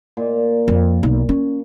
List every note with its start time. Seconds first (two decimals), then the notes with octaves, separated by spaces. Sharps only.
0.17 A#2
0.68 F2
1.03 B1
1.29 C#4